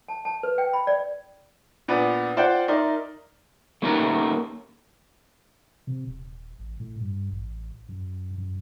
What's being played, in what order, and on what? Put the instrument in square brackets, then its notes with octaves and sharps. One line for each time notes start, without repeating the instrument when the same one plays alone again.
[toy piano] A5
A5
B4
G5
B5
D5
[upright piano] A#2 B3 D4
F4 C5 D5 F#5 G5
D#4 A#4 D5 E5 C6
[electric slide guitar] A3 A#3 C#4 D#4 G4 A#4
[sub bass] C3
D#1
A1
A2
G2
A1
F#2
F#2